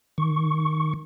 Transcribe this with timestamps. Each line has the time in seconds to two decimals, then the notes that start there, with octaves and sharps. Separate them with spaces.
0.18 D#3 C#6